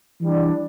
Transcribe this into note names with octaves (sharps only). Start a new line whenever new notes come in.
E3 G3 D4